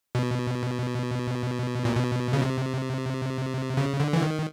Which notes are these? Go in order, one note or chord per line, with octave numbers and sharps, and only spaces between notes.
B2
A#2
B2
C#3
C3
C#3
D3
E3
D#3